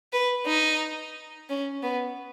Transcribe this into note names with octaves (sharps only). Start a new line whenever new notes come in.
B4
D#4
C#4
B3